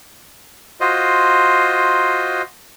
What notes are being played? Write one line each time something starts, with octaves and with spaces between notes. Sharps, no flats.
F4 F#4 C5 D#5